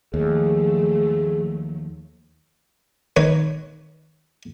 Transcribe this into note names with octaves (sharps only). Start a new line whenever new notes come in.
D#2 F3 F#3 A3 G#4
D#3 B4 C#5